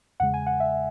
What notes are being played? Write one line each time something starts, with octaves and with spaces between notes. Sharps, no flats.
E2 C#3 G#3 F#5
G#5
F#5
E5